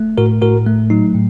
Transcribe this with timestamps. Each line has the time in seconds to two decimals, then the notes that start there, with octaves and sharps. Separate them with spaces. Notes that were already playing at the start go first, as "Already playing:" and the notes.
Already playing: A3
0.18 A2 F#4 A#4
0.41 A2 F#4 A#4
0.66 A3
0.90 F#3 D#4
1.15 A2